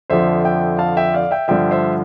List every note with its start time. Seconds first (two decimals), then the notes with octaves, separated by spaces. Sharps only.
0.10 F2 D3 F3 C5 E5
0.44 E5 G5
0.79 F5 A5
0.97 E5 G5
1.14 D5 F5
1.31 E5 G5
1.48 G2 D3 F3 E5 G5
1.71 C5 E5